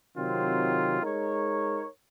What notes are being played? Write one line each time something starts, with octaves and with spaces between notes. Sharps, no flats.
C3 D#3 F#3 C4 F4
G#3 D#4 A#4 C#5